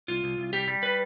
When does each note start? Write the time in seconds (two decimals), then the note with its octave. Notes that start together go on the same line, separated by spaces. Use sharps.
0.08 C2 F4
0.24 C2
0.38 C2
0.53 G3 G4
0.68 G3
0.83 B4